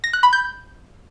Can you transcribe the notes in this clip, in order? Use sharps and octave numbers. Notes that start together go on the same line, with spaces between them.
A#6
F#6
B5
G6